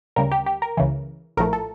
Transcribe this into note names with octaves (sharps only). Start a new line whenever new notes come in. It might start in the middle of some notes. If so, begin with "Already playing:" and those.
D2 C#3 G3 A#4
G4
G4
A#4
C#2 C#3 E3
A#1 A2 F3 A3 A#4
A4